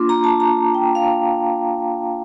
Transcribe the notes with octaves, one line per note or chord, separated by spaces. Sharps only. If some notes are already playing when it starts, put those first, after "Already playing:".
Already playing: A#3 D4 F4 C6 D6
A#5
A5
A#5
G5
F5